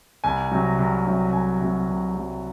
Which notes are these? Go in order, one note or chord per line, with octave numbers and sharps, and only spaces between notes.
C2 G#5
C3 F#3
C2
C3 F#3
C2 G#5
C3 F#3
C2
C3 F#3